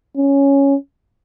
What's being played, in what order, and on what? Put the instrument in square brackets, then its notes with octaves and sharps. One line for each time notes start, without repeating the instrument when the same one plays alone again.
[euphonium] C#4